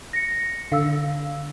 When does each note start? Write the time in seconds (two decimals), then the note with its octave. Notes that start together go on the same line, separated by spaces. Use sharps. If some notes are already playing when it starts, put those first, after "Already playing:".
0.13 A#6 C#7
0.72 D3 F5 E6